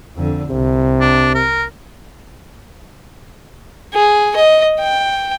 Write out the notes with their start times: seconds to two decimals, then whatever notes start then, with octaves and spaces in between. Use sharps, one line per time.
0.16 F2 D3
0.50 C2 C3
1.01 D4
1.35 A#4
3.94 G#4
4.36 D#5
4.80 G5